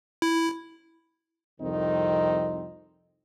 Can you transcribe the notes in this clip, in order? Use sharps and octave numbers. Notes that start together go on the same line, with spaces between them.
E4
C2 F2 D#3 C4 D#4